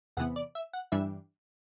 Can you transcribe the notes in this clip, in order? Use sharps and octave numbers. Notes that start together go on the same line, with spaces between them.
E2 C3 E3 B3 F#5
D5
E5
F#5
G2 E3 G3 D4 E5